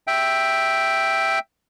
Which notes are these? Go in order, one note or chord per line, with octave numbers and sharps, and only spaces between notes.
E5 G5